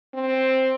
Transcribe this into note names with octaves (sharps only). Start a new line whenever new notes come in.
C4